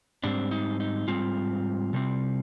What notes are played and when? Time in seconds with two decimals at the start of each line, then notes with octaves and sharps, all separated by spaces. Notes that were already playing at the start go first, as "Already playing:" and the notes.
0.24 G#2 G3 C4 D4
0.51 D#4
0.80 D#4
1.07 G#2 G3 C4 F4
1.93 C3 G3 C4